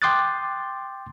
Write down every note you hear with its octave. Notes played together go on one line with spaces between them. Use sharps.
G5 C6 D6 D#6 F#6 A6